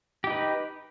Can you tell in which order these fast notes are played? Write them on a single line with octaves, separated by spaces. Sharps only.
G4 D#4 B4